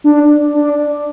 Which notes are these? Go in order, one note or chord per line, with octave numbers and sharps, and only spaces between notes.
D4
D4